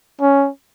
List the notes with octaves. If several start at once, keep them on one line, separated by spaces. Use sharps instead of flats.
C#4